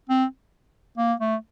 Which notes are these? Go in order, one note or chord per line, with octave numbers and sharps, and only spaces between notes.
C4
A#3
A3